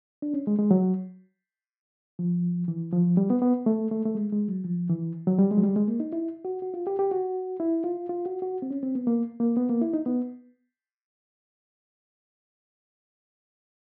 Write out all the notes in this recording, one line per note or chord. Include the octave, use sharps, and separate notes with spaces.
D4
C#4
G#3
G#3
F#3
F3
E3
F3
G3
B3
B3
A3
A3
A3
G#3
G#3
F#3
F3
E3
F#3
G3
G#3
F#3
G3
G#3
A#3
D#4
E4
F#4
F#4
F4
G4
G4
F#4
E4
F4
F4
F#4
F#4
C4
C#4
C4
B3
A#3
A#3
B3
A#3
E4
D#4
B3